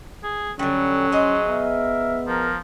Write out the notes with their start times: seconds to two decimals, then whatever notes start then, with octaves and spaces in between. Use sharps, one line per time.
0.24 G#4
0.59 D3 F#3 G3 C#4
1.12 G#4 C5 D#5
1.48 B3 A#4 E5
2.27 F3 A#4